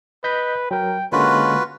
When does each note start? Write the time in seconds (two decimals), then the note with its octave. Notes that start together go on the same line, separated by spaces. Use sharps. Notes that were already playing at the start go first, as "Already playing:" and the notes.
0.24 B4 D#5 G6 B6
0.71 F#3 A#4 G5
1.12 D3 G#3 A#3 C#4 F4 F#4 B4